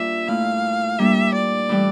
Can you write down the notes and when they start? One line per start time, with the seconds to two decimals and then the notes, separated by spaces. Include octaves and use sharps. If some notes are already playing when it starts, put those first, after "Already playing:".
Already playing: G3 A#3 D4 F4 E5
0.27 A#2 A3 E4 F5
0.99 G3 A#3 D4 E5
1.34 D5
1.69 A2 E3 G3